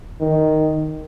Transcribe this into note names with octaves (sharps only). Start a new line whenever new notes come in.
D#3